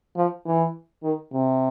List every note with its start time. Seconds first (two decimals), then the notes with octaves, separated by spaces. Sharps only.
0.16 F3
0.45 E3
1.03 D#3
1.32 C3